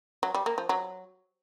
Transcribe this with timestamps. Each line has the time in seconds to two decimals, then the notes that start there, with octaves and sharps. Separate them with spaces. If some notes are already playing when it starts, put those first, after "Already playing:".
0.23 F#3
0.34 G3
0.46 A#3
0.58 F3
0.69 F#3